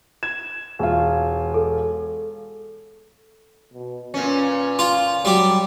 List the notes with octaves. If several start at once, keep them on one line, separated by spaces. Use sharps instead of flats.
G#6 E7
E1 F4
A4
B2
A#2 C#4 B4
F4
F#3 G3 G4